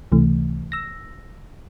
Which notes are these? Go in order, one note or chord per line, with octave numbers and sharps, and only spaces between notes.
C#2 C3 E3 A3
E6 A#6